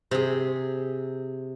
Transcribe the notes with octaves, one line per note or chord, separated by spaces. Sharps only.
C3 G#4